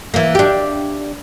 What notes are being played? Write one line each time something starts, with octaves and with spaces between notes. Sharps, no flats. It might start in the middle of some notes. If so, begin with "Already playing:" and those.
E3 A#3
D4 G4